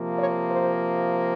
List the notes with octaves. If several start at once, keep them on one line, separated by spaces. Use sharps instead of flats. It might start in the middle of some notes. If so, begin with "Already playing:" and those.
Already playing: C3 F3 A#3
C#5
C5